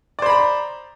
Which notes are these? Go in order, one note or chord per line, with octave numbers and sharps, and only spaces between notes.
C5 D5 A#5 B5